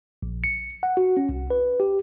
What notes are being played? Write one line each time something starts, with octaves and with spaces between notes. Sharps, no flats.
A#1
C#7
F#5
F#4
C#4
C2
B4
G4